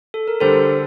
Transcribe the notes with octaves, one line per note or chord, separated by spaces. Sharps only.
A4
A#4
D3 G3 D4 G4 A4 C5